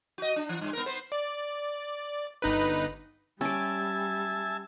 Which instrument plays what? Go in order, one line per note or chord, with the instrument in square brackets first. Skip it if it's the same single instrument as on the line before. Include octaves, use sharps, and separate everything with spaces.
[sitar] F#4 D#5
D4
E3
G2
B3 A#4
B3 C5
[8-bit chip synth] D5
G1 D#4 B4
[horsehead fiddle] G3 [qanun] C#4 D6 [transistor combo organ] E5 G#5 A5